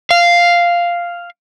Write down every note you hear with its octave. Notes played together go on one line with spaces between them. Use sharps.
F5